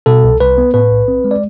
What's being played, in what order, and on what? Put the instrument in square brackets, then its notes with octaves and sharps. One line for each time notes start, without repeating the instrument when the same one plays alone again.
[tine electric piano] B2 A4
C2
C2 B4
B3
A2 B4
B1
C4
G#3
D5